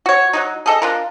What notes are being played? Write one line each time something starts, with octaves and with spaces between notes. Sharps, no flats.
F#4 C#5
F#3 G3 D#4
G#4 A4 D#5
D4 F4 A#4